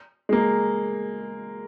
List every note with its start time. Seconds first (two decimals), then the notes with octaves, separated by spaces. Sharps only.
0.29 G#3
0.33 A#3